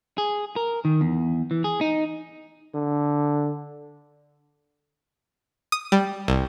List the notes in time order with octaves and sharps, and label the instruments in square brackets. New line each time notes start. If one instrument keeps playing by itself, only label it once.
[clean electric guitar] G#4
A#4
D#3
E2
E3
G#4
D#4
[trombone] D3
[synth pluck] D#6
G3
C2